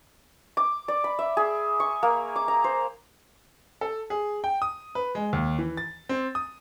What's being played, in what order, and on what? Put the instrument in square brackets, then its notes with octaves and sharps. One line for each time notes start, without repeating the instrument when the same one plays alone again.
[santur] D6
D5
B5
E5
G#4
C#6
A#3
D6
A#5
C5
[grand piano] A4
G#4
G5
D#6
B4
G#3
D#2
E3
A6
C4
D#6